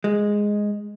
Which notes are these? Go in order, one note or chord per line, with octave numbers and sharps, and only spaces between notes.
G#3